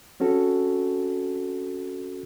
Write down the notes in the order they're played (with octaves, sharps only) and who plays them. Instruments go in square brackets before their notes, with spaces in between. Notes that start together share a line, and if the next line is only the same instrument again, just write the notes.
[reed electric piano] C4 C#4 F#4 A4